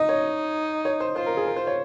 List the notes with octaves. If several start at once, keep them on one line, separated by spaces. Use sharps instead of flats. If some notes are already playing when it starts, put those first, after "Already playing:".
Already playing: D#4 D#5
C#5
C#5
C5
F4 C5
A#4
G#4
A#4
C5
C#5